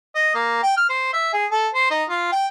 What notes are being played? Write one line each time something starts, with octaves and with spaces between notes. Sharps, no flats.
D#5
A#3
G5
F6
C5
E5
G#4
A4
C5
D#4
F4
G5